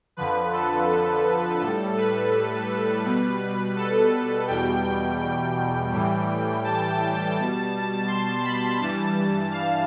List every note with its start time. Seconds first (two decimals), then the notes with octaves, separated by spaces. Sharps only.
0.17 F2 D3 F3 B4
0.52 A4
0.89 A4
1.60 A2 G3 A4
1.97 B4
3.05 B2 G3
3.76 A4
4.48 E2 B2 G3 G5
4.84 G5
5.20 G5
5.92 A2 E3 G3
6.64 A5
7.36 B2 G3
8.07 C6
8.43 B5
8.79 G2 E3 G3 A5
9.51 F5